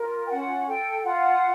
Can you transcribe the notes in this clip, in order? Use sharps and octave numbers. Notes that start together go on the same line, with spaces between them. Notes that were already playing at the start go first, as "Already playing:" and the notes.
Already playing: F4 A#4
G5
C#4 F#5
A4 G5
F4 F#5